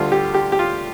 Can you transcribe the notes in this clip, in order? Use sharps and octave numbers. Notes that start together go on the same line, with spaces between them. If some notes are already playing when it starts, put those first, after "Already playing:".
Already playing: D2 D3 G3 F4
G4
G4
G4
F4